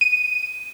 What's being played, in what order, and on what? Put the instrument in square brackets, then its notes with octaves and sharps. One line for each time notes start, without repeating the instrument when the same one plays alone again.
[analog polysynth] D#7